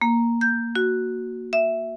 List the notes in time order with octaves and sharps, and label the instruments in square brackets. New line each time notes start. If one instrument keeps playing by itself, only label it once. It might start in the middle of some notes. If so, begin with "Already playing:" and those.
[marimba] A#3
G6
F#4
E5